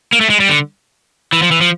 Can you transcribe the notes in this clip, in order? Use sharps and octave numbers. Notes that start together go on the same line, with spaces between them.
A#3
A3
G#3
G3
D3
E3
F3
E3
F3